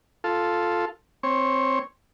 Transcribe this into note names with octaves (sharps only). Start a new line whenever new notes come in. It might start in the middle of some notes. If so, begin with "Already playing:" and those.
F4 A4
C4 C#5